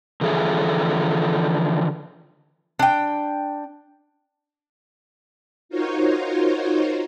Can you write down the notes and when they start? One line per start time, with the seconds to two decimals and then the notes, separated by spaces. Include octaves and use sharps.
0.21 D3 E3 F3 G#4 A4 E5
2.79 D4 G5
5.69 D#4 F4 F#4 A#4 C5 C#5